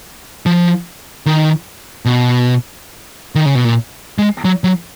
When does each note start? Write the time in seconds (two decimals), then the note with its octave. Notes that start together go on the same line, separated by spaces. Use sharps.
0.46 F3
1.26 D#3
2.05 B2
3.35 D#3
3.45 C#3
3.55 B2
3.65 A#2
4.18 G#3
4.45 F#3
4.64 F#3